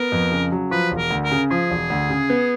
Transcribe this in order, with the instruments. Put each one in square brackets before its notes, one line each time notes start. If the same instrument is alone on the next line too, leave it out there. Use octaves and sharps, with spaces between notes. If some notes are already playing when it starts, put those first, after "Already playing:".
Already playing: [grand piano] B3 [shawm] A#4
[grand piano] F2
C#3
F#3
[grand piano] F3 [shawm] B4
[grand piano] E1
[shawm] A#4
[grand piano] D2
[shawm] A#4
[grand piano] C#3
[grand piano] F3 [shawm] G#4
[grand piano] E1
D2
C#3
B3